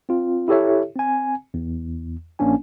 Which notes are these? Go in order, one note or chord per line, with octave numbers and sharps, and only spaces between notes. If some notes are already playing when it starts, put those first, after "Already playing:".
C4 F4
E4 G4 A4 C#5 E5
C4 G#5
E2
A#1 A#3 C#4 D4 G#5